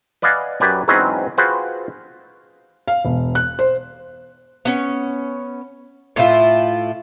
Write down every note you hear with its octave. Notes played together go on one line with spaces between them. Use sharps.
B4 D5 D#5 F5 F#5 G#5
F#2 G4 B4 D5 G#5
E2 G#2 F#3 C4 C#4 B4
F4 F#4 G#4 B4 C5 G5
F5
E1
F#6
C5
B3 C#4
A2 E4 F4